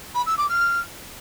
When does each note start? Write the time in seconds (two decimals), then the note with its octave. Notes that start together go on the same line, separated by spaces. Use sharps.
0.14 B5
0.26 E6
0.37 D6
0.49 F6